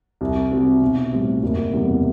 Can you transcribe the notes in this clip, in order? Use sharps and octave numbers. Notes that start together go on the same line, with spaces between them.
C2
C3 G3 C4 F#4
B1
A2 G3 C4
F#1
E2 C3 G3